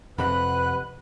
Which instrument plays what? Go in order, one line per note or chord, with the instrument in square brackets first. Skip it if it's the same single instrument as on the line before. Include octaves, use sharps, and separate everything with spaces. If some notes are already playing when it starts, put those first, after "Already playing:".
[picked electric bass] F2 C3 [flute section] B4 F#5 F#6 [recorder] B5